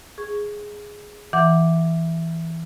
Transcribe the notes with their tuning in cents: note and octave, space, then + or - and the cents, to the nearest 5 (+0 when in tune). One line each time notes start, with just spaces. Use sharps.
G#4 +0 C#6 +0
E3 +0 F#5 +0 D6 +0